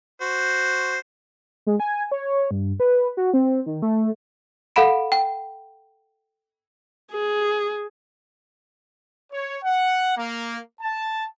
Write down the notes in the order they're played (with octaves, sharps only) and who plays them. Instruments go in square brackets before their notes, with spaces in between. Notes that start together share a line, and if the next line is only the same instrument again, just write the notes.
[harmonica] F#4 C5
[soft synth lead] G#3
G#5
C#5
G2
B4
F#4
C4
D#3
A3
[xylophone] A4 F5 F#5 B5 D7
G5
[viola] G#4
[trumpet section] C#5
F#5
A#3
A5